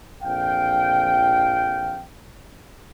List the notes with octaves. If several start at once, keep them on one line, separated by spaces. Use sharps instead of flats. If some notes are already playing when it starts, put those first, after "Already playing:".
A#1 F2 F5 G5